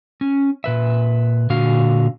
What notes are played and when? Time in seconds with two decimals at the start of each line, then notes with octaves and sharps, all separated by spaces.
0.21 C#4
0.64 A#2 B4 E5
1.50 A#2 D3 F#4 F5